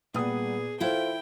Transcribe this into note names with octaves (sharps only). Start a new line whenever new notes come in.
A#2 G3 B3 G#4 F#5 D#6
E3 E4 F4 A4 C5 G5